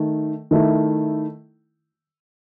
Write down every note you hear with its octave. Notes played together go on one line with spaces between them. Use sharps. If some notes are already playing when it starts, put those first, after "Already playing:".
Already playing: D#3 A3
D#3 A3 E4